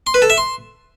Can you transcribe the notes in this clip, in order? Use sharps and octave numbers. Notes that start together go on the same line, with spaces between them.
C6
B4
A4
E5
C6